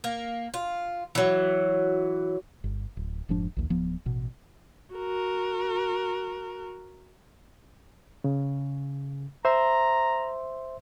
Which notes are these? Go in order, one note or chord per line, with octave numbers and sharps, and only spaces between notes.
A#3
F4
E3 F#3
G1
D1
F1 G#2 F3 D4
A#1 D#2
D1 F3 B3
A1 B2
F#4 A#4
C#3
C5 E5 A#5 C6